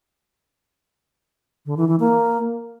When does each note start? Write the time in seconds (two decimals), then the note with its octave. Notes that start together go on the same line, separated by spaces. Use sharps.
1.66 D3
1.77 E3
1.88 E3
2.00 A#3